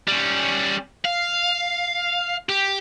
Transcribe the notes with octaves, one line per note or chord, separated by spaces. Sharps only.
G3 C#4
F5
G4